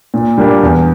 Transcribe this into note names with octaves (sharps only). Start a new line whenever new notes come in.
A#2
G3 A#3 D4
E2